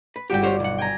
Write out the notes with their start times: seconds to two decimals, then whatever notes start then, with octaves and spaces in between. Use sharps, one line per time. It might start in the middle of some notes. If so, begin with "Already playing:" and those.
0.16 B4
0.30 G1 F#4 G4 G5 D6
0.43 G4 C5 C#5
0.60 B1 F#5
0.78 G5 G#5 A#5